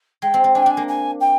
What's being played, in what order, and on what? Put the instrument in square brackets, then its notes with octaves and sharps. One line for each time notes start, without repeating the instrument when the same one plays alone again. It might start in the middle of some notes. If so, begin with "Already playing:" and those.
[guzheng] G#3 [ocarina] G5
[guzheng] C4
C4
[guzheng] D4 [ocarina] G#5
[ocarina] G5
[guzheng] D4 [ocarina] G#5
[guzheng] A#3
[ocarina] G#5
G5